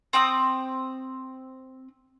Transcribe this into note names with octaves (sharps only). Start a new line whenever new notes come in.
C4 G5 D#6